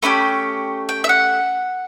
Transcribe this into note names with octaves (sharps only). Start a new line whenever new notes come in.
A3 C#4 G4 B5
G5
E5
F#5